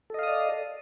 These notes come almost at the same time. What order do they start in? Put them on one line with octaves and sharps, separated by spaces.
A4 D#5 F5 D#6 D5